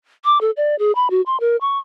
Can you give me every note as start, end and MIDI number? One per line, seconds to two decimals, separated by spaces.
0.25 0.38 86
0.41 0.51 69
0.57 0.75 74
0.79 0.92 68
0.95 1.08 83
1.10 1.21 66
1.26 1.39 84
1.40 1.56 70
1.61 1.78 85